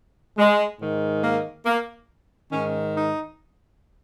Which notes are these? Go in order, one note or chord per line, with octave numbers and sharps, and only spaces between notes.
G#3
G#2 D#3
A#3
A#3
G#2 D#3 C#4
D#4